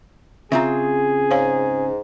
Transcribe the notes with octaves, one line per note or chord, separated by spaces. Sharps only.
C#3 C4 F4 G#4 E5 A#5
G#2 C#5 F5 G#5